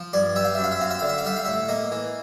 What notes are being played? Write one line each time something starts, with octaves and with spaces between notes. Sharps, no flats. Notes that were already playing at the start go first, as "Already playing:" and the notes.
Already playing: F3
G2 D5
G3 E5
F5
F#2 E5
F5
E5
C4 F5
E5
D3 F5
E5
F5
G3 E5
F5
A2 E5
A#3 D#5
E3